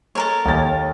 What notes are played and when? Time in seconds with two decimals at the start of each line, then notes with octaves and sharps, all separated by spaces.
0.15 A4 A#4 C#5
0.45 D#2 A6